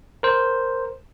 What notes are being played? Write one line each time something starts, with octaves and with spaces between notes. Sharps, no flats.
A#4 C5